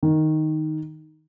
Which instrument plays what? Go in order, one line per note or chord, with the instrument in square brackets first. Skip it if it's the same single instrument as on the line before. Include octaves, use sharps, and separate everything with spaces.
[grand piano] D#3